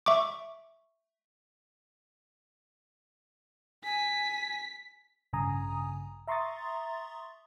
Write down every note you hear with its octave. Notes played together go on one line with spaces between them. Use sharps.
E5 C#6 D6
G#5 B6
A1 G2 C#3 G#5 A#5 D#6
E5 A#5 C6 C#6 D#6 A6